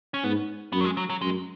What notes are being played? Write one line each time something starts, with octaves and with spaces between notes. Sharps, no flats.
C#4
G#2 B3
F#2 B3
F#3
G#3
F#3
F#3
F#2 G#3